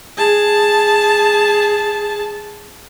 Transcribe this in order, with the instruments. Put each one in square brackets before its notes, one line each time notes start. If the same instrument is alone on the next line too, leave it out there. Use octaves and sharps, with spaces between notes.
[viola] G#4 A5